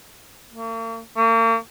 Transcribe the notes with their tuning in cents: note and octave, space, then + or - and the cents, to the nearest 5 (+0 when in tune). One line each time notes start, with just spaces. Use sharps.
A#3 -45
A#3 -40